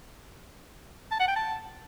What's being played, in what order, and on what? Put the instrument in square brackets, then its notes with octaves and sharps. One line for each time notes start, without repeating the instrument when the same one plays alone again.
[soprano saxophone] A5
F#5
G5
A5